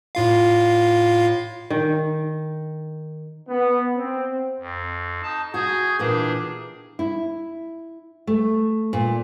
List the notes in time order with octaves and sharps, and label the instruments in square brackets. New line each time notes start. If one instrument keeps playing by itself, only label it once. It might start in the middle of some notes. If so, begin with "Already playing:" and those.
[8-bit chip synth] A2 F4 F5
[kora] D#3
[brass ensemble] B3
C4
[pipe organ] F2
[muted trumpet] D#4 [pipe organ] A5
[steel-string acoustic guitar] F#4 [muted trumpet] G#4 [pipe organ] G6
[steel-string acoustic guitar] A#2 E3 A#3 [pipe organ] D4 G#4 [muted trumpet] G4
[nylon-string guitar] E4
A3
A#2